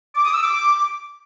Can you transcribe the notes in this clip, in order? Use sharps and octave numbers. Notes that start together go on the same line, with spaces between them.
D6
D#6
E6
D6